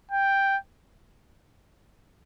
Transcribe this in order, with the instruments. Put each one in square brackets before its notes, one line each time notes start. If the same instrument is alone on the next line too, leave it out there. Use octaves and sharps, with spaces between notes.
[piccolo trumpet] G5